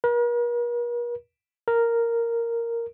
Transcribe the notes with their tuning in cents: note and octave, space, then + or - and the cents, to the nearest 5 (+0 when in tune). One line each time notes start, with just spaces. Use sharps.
A#4 +45
A#4 -5